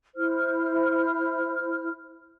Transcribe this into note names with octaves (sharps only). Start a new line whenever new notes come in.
E4 C5 F6